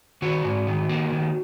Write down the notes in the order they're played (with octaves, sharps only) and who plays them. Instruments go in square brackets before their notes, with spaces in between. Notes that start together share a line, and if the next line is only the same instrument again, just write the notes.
[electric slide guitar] D#3 F#4
G#2
D#3
A#3
D#3